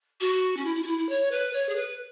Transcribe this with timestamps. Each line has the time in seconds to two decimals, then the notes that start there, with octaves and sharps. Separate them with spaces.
0.20 F#4
0.57 C#4
0.64 E4
0.75 E4
0.83 F#4
0.87 E4
0.98 E4
1.09 C#5
1.31 B4
1.53 C#5
1.69 G#4
1.75 B4